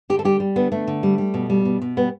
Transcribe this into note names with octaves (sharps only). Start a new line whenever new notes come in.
D3 G4
A4
G3 G4
G3
D3 B3
D3 A3
D3
G3
G3
B2
G3
B2
B2
G3 B3